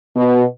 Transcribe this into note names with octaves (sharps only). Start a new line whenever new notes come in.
B2